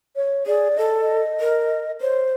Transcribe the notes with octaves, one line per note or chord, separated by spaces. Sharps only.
C#5
G#4 D5
A4 D#5
D#5
A#4
C5 C#5